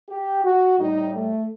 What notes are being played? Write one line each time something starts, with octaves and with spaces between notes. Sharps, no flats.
G4
F#4
A2 G3 D#4
A3